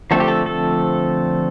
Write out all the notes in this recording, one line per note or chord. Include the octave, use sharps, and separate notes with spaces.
D3 F3 A3 C4 A4
G4
A4
A4